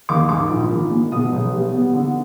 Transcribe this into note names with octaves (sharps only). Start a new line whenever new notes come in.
D#2 D6
G#2 D6
A#1
D#3
G#3
B2 D#6
B1
G3
B3
D3